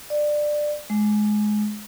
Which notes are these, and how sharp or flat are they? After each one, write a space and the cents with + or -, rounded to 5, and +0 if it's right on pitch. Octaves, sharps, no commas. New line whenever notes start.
D5 +15
G#3 +20